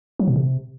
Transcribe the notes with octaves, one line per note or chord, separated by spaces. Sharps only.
F#3
B2
C3